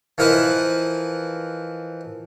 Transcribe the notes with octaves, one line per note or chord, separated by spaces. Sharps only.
E3 F3 A#4 B4 D#5 E5